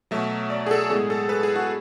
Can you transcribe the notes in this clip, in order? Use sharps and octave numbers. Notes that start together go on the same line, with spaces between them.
B2 F#3 A3 E5
D5
G#4
A4
A2 G#3 B3 G#4
A4
B4
G#4
F#4